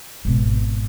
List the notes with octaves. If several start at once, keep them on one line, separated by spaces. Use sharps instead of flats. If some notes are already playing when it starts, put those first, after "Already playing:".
G#1 B2